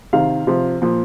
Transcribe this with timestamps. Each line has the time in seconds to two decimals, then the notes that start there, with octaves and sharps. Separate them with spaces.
0.13 C3 D#3 F5
0.47 C3 F3
0.82 A#2 F3